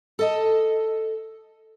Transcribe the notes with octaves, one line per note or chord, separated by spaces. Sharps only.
A4 D#5 A5